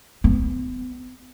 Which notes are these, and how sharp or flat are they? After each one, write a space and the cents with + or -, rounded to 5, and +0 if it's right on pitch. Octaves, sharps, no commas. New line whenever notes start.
B3 +35